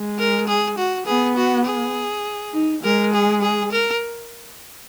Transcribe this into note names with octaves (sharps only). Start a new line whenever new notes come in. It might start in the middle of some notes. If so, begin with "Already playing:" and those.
Already playing: G#3
A#4
G#4
F#4
B3 G#4
F#4
G#4
D#4
G#3 A#4
G#4
G#4
A#4